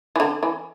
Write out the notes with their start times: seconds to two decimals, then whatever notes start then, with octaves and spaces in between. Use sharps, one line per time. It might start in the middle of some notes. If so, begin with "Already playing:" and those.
0.16 E3
0.20 D3
0.43 E3